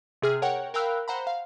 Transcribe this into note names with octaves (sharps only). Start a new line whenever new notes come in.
C3 G#4 F6
A#4 C#5 F#5 G5
A#4 F5 G5 B5 E6 F#6
C5 F#5 A#5 B5
F5